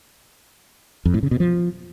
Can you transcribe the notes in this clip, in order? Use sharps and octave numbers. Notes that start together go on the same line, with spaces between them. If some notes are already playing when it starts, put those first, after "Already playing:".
F2
A2
C#3
B2
F3